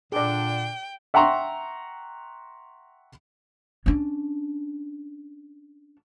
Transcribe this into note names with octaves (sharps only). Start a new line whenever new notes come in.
A#2 D3 D4 G#4 D5 G5
E5 F#5 G5 A#5 C6 C#6
C#4 D4